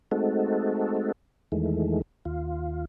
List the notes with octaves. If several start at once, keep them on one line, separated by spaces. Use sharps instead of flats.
G#3 A3 C4 D#4 F#4 A4
E2 D#3 E3 G#3 A3
D#2 F4